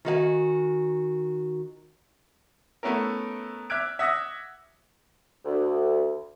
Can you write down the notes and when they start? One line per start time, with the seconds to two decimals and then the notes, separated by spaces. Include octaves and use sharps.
0.05 D#3 F#4 F5 G#5
2.83 A3 B3 C#4 E4 A#4
3.70 E5 D6 F6 F#6 G#6 D7
3.99 E5 F#5 D#6 G#6 A#6
5.45 D2